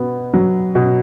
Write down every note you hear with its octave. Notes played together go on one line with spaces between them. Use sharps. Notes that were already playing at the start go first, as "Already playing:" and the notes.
Already playing: B2 B3
F#3
B2